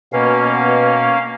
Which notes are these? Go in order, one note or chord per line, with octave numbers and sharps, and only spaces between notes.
B2 A#3 C#4 F5